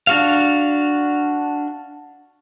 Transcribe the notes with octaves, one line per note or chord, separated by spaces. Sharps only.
D4 F#4 F5